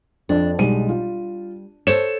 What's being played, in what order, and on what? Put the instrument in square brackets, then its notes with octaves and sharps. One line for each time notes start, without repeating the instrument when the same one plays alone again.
[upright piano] F2 [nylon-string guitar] D4
[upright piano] B1 G#3 D#7 [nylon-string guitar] G3
[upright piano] F4
[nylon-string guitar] A4 C5 C#5 [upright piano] E7